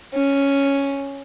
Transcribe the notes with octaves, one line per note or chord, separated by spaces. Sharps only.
C#4